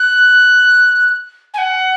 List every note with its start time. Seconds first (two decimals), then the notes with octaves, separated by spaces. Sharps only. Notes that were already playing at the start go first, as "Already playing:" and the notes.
Already playing: F#6
1.54 G#5
1.58 F#5